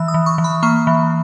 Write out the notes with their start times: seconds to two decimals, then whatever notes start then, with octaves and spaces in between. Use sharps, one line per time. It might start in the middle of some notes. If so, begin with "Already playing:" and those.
Already playing: E3 E6
0.08 D#6
0.14 E3
0.26 C#6
0.38 E3
0.44 B5
0.63 A#3 C#6
0.87 E3